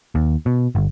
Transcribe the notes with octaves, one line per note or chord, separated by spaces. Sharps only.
D#2
B2
G1